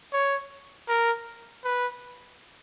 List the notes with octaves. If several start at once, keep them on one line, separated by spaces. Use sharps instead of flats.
C#5
A#4
B4